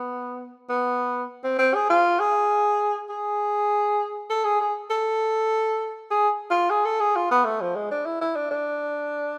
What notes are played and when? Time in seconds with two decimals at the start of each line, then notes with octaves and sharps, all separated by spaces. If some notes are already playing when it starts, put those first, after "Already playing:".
Already playing: B3
0.69 B3
1.44 C4
1.59 C4
1.75 G#4
1.90 F4
2.20 G#4
3.10 G#4
4.30 A4
4.44 G#4
4.60 G#4
4.91 A4
6.11 G#4
6.51 F4
6.70 G#4
6.85 A4
7.00 G#4
7.16 F4
7.31 B3
7.45 A3
7.61 F3
7.76 G#3
7.91 D4
8.06 E4
8.21 E4
8.36 D4
8.51 D4